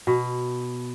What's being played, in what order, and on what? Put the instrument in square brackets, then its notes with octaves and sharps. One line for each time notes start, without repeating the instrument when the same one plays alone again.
[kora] B2